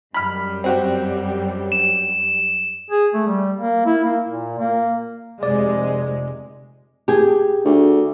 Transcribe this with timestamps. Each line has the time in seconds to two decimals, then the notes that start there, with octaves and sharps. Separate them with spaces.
0.14 F#2 G3 B5 F6
0.64 C4 F#4 G4
1.72 E7
2.91 G#4
3.14 A3
3.27 G3
3.57 A#3
3.86 E4
4.04 A#3
4.28 A#2
4.59 A#3
5.43 F1 C3 G#3 D5
7.08 G4 G#4
7.65 D2